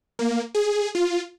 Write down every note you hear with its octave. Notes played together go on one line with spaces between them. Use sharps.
A#3
G#4
F4